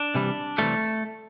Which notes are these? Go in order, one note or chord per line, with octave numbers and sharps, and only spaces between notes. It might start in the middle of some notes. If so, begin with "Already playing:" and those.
Already playing: D4
C3 E3 G3
C3 E3 G3 A3